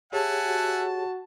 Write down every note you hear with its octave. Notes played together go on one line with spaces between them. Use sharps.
G4 G#4 C#5 E5 F#5 G#5 A5
F#4